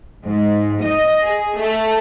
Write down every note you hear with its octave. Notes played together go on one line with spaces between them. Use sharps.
G#2
D#5
G#4
A3